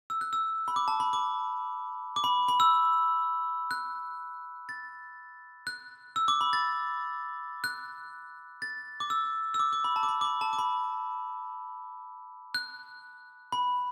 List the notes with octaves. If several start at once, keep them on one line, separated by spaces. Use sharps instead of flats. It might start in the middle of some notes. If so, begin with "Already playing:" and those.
E6
F#6
E6
B5
D6
A5
B5
D6
D6
B5
B5
E6
F#6
A6
F#6
E6
D6
B5
A6
F#6
A6
D6
E6
E6
D6
D6
B5
A5
D6
B5
D6
B5
A5
D6
B5
F#6
B5